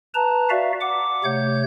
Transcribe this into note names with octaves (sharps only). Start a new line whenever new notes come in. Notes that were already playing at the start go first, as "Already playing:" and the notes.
B4 A5 A#5
F#4 D5 E5 F5
F#5 D6
C3 A3 C#5 G6